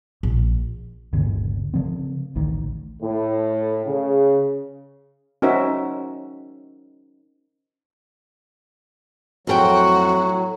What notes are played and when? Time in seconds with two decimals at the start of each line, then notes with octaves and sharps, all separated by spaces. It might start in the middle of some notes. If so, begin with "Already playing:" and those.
0.23 A#1
1.13 G1 D2 A#2 C#3
1.74 C#3 F3 C4
2.35 A1 D2 D#3
3.02 A2
3.86 C#3
5.42 C#4 D#4 F#4 A#4 C5 E5
9.47 F2 A2 F#3 F#4 A4 G5